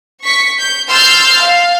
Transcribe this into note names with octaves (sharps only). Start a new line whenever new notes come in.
C#6 B6 C#7
G6
C6 E6 F6 G6 A6
F5